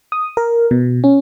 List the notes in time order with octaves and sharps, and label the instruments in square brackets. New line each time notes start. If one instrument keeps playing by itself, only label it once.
[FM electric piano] D#6
A#4
B2
C#4